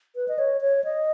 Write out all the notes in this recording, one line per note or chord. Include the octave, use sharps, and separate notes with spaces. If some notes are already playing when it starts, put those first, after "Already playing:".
B4
D#5
C#5
C#5
D#5